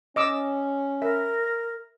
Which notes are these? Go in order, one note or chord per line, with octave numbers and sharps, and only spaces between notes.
C#4 D#5 D6 E6
A#4 E5